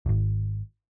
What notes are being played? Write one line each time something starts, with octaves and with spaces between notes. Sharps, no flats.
D1 G#1